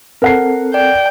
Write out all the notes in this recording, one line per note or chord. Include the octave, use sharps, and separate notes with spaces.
C4 A4 A#4 F#5 C7
D5 G5